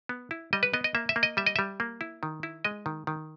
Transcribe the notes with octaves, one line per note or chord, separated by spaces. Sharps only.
B3
E4
G3 D#5
B4
B3 D#5
D#5
A#3 E5
E5
A#3
D#5
G3 E5
D#5
G3 E5
A#3
E4
D#3
E4
G#3 D#5
D#3
D#3